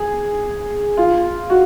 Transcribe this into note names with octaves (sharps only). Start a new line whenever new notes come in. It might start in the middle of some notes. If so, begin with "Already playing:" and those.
Already playing: G#4
F4
F#4